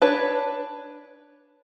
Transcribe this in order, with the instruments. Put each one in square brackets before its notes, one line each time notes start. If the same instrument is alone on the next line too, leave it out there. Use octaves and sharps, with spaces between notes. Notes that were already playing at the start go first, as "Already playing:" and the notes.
[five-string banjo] D4 B4 C#5